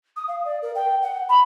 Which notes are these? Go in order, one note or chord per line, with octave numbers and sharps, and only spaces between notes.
D#6
F5
D5
A#4
G5
F#5
B5